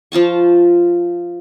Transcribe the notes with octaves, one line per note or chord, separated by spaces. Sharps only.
F3 F4 A5 C#6